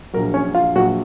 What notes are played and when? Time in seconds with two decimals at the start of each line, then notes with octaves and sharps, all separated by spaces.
0.13 A#1 A#2 F#3 A#4
0.34 C#4 C#5
0.55 F4 F5
0.76 A#1 A#2 F#3 F#4 F#5